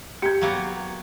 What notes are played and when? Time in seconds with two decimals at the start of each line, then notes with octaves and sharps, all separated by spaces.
0.22 G4 G#6 C#7
0.41 F#3 A#3 B3